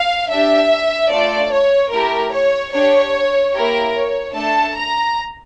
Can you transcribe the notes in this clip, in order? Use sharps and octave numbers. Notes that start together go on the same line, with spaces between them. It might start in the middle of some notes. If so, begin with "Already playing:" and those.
Already playing: F5
D4 G4 E5
A3 D4 F4 A4 D5
C#5
A3 E4 G4 A#4
C#5
D4 G4 C#5
A#3 E4 G4 A#4
C#5
A3 D4 A4 A5
A#5